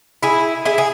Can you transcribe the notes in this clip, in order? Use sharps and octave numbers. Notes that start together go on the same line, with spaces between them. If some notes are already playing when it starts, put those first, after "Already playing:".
E4 G#4
E4 G#4
G#4